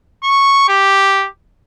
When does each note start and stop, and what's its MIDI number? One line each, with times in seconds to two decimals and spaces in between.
0.24 0.65 85
0.68 1.27 67